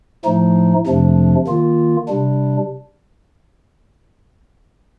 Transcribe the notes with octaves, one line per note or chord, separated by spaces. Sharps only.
A2 F3 A3 D#4
F2 C3 F3 A3 D4
D#3 A#3 F4
C3 G3 D4